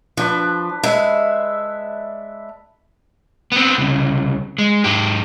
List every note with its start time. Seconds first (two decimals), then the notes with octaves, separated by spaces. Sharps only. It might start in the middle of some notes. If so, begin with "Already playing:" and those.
0.17 F3 D4 B4
0.83 G#3 B4 E5
3.52 B3 C4
3.78 C2 C#3
4.58 G#3
4.84 G#2 G4